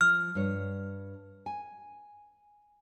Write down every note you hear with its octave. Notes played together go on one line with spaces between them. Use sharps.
F3 F6
G2 C#5
G#5